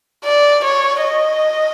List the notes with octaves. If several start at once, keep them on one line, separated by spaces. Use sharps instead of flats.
D5
C#5
D#5